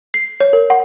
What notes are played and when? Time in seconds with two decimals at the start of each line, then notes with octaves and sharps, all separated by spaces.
0.14 C7
0.40 C#5
0.53 A#4
0.70 F#5